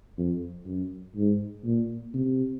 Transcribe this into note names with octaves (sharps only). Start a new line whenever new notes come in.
F2
F#2
G#2
A#2
C3